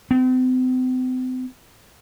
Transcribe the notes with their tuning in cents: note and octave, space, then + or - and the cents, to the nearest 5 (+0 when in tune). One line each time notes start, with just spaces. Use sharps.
C4 -40